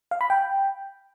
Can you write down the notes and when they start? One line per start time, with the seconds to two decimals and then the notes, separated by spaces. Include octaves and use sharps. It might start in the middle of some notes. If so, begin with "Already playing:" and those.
0.11 F5
0.21 B5
0.30 G5